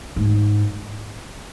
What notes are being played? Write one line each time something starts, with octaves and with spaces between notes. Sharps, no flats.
G#2